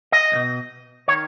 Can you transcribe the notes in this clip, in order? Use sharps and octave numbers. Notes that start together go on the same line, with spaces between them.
D#5
B1
B2
D#3 C#5